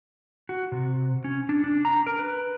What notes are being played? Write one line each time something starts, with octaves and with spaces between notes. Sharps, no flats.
F#4
C3
C#4
D4
D4
A#5
A#4
B4